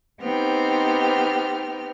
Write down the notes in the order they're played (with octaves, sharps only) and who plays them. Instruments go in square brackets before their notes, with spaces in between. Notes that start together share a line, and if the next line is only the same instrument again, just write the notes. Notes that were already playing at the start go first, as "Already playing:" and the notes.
[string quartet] B3 C4 D#4 G4 G5 F6